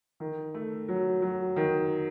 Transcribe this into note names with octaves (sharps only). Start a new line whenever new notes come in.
D#3
A3
F#3
F#3
D#3